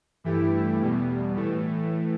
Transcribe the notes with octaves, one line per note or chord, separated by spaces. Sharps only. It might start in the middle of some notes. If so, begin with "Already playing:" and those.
G2 E3 A3 E4 G4
E2 B2 G3
A2 E3 A3